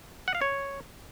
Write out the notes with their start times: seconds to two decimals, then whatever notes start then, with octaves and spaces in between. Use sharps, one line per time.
0.28 F#5
0.35 F5
0.41 C#5